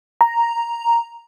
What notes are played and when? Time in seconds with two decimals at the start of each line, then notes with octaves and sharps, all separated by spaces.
0.21 A#5